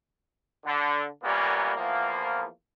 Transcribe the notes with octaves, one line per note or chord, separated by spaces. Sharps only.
D3
F#2 A#2 G3 A#3 B3 C#4
E2 F3 A#3